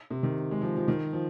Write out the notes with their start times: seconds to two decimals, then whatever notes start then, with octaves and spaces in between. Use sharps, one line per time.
0.10 C3
0.23 D#3
0.51 G#3
0.62 F3
0.77 F3
0.88 D#3
1.13 F3